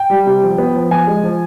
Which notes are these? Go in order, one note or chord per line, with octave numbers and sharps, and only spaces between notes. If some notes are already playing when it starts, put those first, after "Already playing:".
Already playing: G5
G3
C3
F3
B3
F3
F3 G#5
G#3
F3